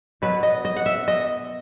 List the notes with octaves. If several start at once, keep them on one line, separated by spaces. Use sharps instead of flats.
B2 F#3 B3 B4
D#5
D#5
F#5
E5
D#5